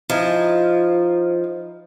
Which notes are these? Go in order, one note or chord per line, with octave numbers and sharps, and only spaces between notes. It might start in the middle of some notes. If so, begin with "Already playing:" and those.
F3 D#4 E4 G#5